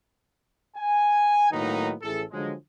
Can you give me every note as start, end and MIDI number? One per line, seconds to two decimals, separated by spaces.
0.77 1.48 80
1.51 1.92 45
1.51 1.92 51
1.51 1.92 54
1.51 1.92 58
1.51 1.92 59
1.51 1.92 63
2.02 2.23 33
2.02 2.23 45
2.02 2.23 64
2.02 2.23 68
2.02 2.23 69
2.32 2.53 50
2.32 2.53 53
2.32 2.53 54
2.32 2.53 56